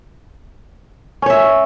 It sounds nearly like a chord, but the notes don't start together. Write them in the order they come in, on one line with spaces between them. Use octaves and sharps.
C#4 C#5 E5